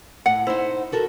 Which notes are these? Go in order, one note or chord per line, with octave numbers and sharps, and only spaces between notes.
A2 F#5
D#4 E4 C5
F#4 A4 A#4